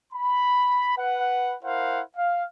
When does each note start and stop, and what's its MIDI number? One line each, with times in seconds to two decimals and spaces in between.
0.13 0.92 83
0.97 1.55 71
0.97 1.55 78
1.63 2.01 64
1.63 2.01 70
1.63 2.01 72
1.63 2.01 77
1.63 2.01 78
2.16 2.44 77